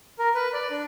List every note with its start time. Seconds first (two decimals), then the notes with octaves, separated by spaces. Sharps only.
0.19 A#4
0.35 B4
0.53 D5
0.71 D4